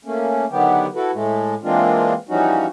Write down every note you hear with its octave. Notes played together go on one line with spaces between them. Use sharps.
A3 A#3 C#4
D3 D#3 F#3 B3 G4
E4 F#4 A4 B4
A2 G#3 A3
E3 G#3 A#3 C4 D4 F4
E3 F3 G3 C#4 D#4 F#4